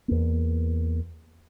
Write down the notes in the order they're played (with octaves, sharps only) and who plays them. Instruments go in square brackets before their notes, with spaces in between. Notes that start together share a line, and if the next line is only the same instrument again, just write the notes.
[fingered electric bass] E2 A#3